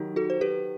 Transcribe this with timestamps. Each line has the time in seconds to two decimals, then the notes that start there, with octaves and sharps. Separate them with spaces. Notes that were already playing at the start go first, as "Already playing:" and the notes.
Already playing: D#3 F#3 D#4 G4
0.16 F#4 A4
0.30 C5
0.41 G4 B4